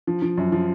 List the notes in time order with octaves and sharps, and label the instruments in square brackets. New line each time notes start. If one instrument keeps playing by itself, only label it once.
[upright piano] F3
F3
F#2
F3